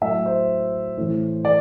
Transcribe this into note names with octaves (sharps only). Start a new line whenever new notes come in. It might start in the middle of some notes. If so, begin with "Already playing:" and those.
A2 F#3 E5
C5
A2 E3
D5